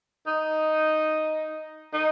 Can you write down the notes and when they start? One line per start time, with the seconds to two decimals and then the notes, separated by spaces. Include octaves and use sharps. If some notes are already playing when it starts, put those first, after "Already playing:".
0.27 D#4
1.93 D#4